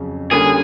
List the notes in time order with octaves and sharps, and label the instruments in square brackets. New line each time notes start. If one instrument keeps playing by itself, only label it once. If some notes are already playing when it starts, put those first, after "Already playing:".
Already playing: [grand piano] F2 C#3 F#3
[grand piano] D3 G3 A#3 C#4 [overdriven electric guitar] G#4